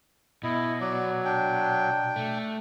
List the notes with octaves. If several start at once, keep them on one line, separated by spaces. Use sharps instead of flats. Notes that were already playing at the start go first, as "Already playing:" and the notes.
B2 E4 D#5
F#3 D5
D4 G5
A3